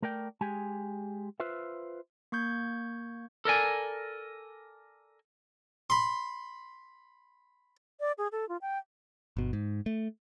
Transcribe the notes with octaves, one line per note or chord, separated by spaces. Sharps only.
A3 A#4 D5 G5
G#3 G4 G#5
F4 B4 C5 E5
A#3 C#6 G6 G#6
A4 A#4 D5 G#5
B5 C6
D5
G#4
A4
F4
G5
G1 B2
G#2
A3